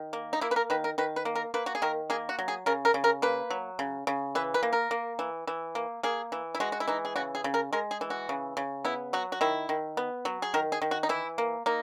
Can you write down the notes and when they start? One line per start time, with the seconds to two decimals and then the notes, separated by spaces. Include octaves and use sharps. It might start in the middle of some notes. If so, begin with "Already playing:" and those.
Already playing: D#3
0.13 A#3
0.33 D#4
0.41 A#3 E4
0.51 B4
0.56 A#4
0.70 D#3 B4
0.84 A#4
0.98 D#3 B4
1.16 B4
1.25 A#3
1.35 A#4
1.54 A#3 B4
1.66 F#4
1.75 G#4
1.82 D#3 A#4
2.10 A#3 G#4
2.29 F#4
2.39 F#3
2.48 G#4
2.66 C#3 A#4
2.85 A#4
2.94 C#3
3.04 A#4
3.22 A#3 B4
3.50 F#3
3.79 C#3
4.07 C#3
4.35 E3 B4
4.54 B4
4.63 A#3
4.73 A#4
4.91 A#3
5.19 E3
5.47 E3
5.75 A#3
6.03 A#3 G#4
6.32 E3
6.55 E4
6.60 G#3 F#4
6.72 F#4
6.80 E4
6.88 E3 D#4
7.05 G#4
7.16 C#3 F#4
7.35 G#4
7.44 C#3
7.54 A#4
7.73 G#3 A#4
7.91 G#4
8.01 E3
8.10 F#4
8.29 C#3
8.57 C#3
8.85 B3 E4
9.13 F#3 F#4
9.32 F#4
9.41 D#3 E4
9.69 D#3
9.97 B3
10.25 F#3
10.42 G#4
10.54 D#3 A#4
10.72 G#4
10.82 D#3
10.91 F#4
11.03 D#4
11.09 E3 E4
11.38 A#3
11.66 A#3 D#4